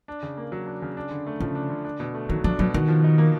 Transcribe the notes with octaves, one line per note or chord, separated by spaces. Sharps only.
D4
C#3
A#3
F#3
D4
C#3
D4
D3
A3
C#3 F3
D4
D3
D4
B2
A3
D#3 F#3
F3 D4
B2 F#3
D#3 F#4
F3
D#4
A#3